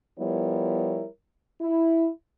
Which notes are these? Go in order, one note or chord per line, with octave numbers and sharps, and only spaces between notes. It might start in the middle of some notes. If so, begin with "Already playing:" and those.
F3 G3 B3 E4 A#4 C#5
E4